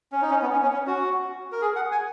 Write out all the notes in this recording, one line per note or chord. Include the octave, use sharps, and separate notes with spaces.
C#4
D#4
C#4
B3
C#4
C#4
C#4
F#4
A#4
G#4
F#5
G#5